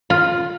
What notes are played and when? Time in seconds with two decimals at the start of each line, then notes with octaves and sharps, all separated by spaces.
0.10 F4